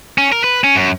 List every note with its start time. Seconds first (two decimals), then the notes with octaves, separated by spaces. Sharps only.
0.18 C#4
0.32 A#4
0.44 B4
0.64 C#4
0.76 F#2